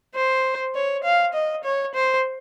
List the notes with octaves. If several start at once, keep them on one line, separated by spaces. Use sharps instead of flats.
C5
C#5
F5
D#5
C#5
C5